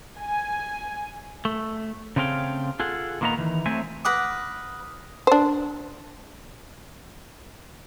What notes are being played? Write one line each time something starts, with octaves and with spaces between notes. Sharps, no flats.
G#5
A3
C#3 A3 C4 G#4 F5 G5
F4 G#4 A4 F#5
A#2 D#3 A#3 B3 D#5 A#5
D#3 E3
F#3 A3 C4 C5 E5 G#5
B4 F#5 D6 D#6 F6 A#6
D4 C5